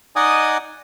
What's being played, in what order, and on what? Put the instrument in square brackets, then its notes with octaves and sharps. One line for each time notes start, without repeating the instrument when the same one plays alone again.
[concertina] D#4 D5 D#5 F#5 G#5 D#6